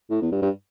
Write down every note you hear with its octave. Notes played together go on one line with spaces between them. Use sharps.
A2
E2
G2
G2